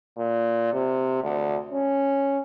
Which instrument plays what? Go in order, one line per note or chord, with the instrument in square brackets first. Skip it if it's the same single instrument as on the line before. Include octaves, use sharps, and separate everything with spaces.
[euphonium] A#2
C3
D2
C#4